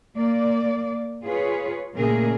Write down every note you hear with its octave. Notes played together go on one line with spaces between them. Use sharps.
A#3 D5
F4 G#4 B4 C#5
A#2 C#3 A3 G#4 A#4